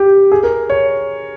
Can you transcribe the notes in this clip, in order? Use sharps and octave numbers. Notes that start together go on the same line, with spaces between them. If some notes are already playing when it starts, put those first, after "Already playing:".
Already playing: G4
G#4
A#4
C#5